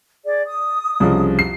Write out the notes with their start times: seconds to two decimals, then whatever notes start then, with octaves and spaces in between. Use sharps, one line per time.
0.25 G#4 D5
0.45 D#6
1.00 C2 C#3 F3
1.39 C7